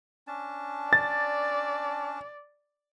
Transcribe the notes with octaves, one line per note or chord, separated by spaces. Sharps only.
C#4 D4 A5
D5 A6